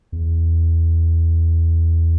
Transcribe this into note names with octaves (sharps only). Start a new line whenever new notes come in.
E2